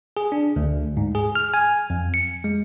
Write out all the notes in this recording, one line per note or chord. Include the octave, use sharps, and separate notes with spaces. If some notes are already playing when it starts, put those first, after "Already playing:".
G#4
D4
D2
G#2
G#4
F6
G#5
F2
C#7
G#3